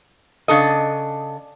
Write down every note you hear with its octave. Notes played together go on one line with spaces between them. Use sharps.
C#3 D4 A4 D#5